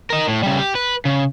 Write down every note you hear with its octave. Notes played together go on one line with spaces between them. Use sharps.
A#4 D#5
A2
C#3 G3
G4
B4
C#3